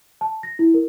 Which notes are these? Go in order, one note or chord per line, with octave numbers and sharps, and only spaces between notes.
A5
A#6
E4
A#4